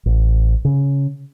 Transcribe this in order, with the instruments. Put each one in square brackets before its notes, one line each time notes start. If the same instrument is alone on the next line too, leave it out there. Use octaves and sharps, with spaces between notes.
[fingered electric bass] A1
C#3